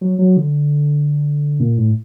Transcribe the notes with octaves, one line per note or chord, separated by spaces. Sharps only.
F#3
F#3
D3
A#2
A2